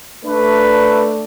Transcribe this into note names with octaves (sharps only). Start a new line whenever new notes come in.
A3 D4 B4